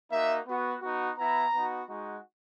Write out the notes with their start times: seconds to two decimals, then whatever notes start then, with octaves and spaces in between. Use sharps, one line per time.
0.11 A#3 D#4 F#4 E5
0.47 B3 F#4
0.82 B3 D#4 F#4
1.18 B3 E4 A#5
1.54 B3 D#4 F#4
1.89 G#3 D#4 F#4